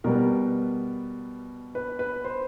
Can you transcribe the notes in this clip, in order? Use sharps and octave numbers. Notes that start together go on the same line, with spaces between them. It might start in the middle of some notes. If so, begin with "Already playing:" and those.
B2 G3 B3 A#4
B4
B4
C5